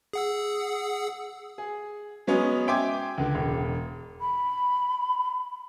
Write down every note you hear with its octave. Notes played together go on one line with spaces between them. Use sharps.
G#4 F#5 E6
G#4
F#3 G#3 B3 C#4
E5 G5 G#5 C6 D6 G#6
C#2 D3
E1
B5